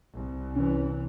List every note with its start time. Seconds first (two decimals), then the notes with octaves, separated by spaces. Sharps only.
0.15 C2
0.55 C3 E3 C#4